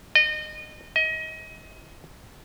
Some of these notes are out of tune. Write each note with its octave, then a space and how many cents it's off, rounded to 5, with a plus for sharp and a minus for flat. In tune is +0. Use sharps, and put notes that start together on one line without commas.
D#5 -30
D#5 +25